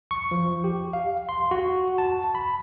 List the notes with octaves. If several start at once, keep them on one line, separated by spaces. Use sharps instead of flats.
C#6
F3
G4
F5
C6
F#4
A5
B5